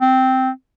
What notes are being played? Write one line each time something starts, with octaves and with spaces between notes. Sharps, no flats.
C4